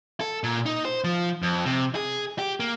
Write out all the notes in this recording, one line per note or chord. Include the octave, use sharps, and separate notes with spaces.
A4
A#2
D#4
C5
F3
F2
C3
G#4
G4
A#3